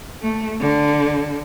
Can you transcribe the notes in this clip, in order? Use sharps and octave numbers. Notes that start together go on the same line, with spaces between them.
A3
D3